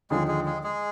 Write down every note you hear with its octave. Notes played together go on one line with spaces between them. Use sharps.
D#2 D3 F3 G#3 G#4
G#3 G#4
G#3 G#4
G#3 G#4